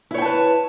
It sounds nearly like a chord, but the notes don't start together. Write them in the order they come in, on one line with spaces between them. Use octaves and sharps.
E4 C#5 G5 A5 B4